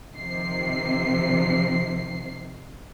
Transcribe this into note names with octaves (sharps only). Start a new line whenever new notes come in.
C3 D#3 F3 C7